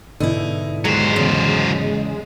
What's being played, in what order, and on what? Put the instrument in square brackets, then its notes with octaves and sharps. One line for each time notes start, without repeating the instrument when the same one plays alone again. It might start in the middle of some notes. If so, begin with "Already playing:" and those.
[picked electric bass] G#2 B2 D3 [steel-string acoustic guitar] D#4 E4
[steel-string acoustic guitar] D#2 [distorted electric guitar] F#3 C5 [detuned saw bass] G#3
[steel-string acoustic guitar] E2 C#3